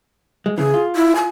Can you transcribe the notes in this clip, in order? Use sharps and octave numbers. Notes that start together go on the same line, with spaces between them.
G#3
C#3 E3 G#4
F4
E4
G#5